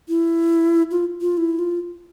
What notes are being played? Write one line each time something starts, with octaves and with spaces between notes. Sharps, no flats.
E4
F4
F4
E4
F4